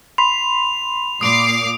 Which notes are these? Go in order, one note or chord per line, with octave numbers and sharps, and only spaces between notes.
B5 C6 F7
A#2 D6 D#6 C7 D7